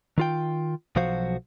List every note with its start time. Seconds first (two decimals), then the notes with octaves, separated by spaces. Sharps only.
0.18 D#3 F4 G5
0.96 B1 F3 F#3 F#4 C5 F5